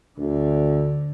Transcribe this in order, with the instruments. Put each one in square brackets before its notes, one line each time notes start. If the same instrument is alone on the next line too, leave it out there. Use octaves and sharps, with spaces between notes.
[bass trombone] D2 [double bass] D3